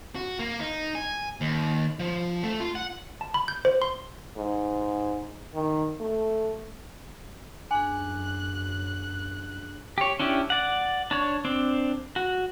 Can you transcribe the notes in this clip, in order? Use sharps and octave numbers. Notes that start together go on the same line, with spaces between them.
F#4
A#3
D#4
G#5
D#2
F3
A3
F4
F#5
A5
B5
G6
C5
C6
G#2
D#3
A3
F#2 D4 G#4 G#5 F#6
G4 C#5
C#4 D4 E4 G4
D5 F#5
D4 C#5
C4 D4
F#4